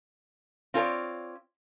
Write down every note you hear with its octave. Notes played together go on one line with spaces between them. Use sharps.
C4 F4 G#4 A4 C#5 D5